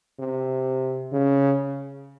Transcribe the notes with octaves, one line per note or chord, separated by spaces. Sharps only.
C3
C#3